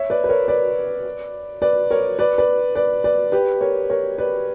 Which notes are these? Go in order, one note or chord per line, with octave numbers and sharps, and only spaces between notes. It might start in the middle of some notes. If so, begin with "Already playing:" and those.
Already playing: C#5 E5
B4 D5
B4
A#4 C#5
B4 D5
B4 D5
A#4 C#5
B4 D5
B4 D5
B4 D5
B4 D5
G4 B4
A#4 C#5
A#4 C#5
B4 D5